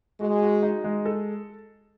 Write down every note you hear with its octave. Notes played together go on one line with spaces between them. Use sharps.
G#3 F#4
F#4
D#4
G#3
A4